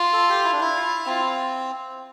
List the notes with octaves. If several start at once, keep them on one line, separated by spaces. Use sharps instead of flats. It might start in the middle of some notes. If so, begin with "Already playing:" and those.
Already playing: F4
A4
G4
E4
D4
E4
F4
C4 F4